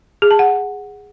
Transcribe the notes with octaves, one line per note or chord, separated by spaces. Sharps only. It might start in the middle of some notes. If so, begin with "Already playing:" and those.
G#4
A5
F#5